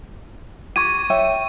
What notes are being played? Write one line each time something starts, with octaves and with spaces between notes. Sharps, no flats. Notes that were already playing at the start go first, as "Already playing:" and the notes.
G4 C#6 G#6 D#7
C#5 E5 G5